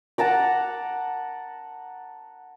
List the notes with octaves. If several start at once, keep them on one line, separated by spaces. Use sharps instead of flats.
F#5 A5 A#5 D6